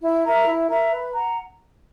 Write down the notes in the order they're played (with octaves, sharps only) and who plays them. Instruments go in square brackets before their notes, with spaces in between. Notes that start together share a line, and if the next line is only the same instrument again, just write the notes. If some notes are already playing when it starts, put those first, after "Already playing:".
[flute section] E4
A#4 E5 A#5
E4
A#4 E5 A#5
B4
F#5 A#5